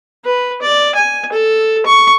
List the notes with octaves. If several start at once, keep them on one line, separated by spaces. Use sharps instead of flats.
B4
D5
G#5
A4
C#6